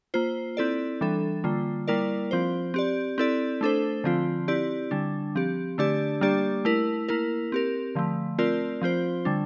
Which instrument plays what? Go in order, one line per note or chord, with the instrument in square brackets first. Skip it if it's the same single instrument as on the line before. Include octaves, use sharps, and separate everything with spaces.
[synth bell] A#3 F4 C5
C4 E4 A4 D5
E3 G3 D4 A4
D3 G3 A#3 F4
G3 A#3 E4 A#4 D5
F3 C4 F4 C5
C4 G4 D5
C4 E4 A4 D5
A3 D4 A4 C5
D3 F3 C4 F4
C4 E4 G4 D5
D3 G3 D4
F3 C4 G4
D3 A3 D4 G4 D5
G3 A#3 D4 G4 D5
A3 E4 A#4
A#3 E4 A#4
C4 G4 A#4
D3 F3 A3
A3 C4 F4 A#4 D5
F3 C4 F4 C5
D3 G3 D4